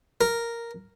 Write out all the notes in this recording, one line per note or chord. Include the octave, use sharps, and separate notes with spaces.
A#4